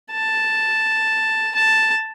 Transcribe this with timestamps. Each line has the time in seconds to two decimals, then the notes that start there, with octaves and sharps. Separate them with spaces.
0.11 A5
1.55 A5